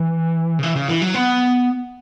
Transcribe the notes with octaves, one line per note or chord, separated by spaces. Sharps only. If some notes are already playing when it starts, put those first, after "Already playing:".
Already playing: E3
C#3
E3
C#3
E3
F#3
B3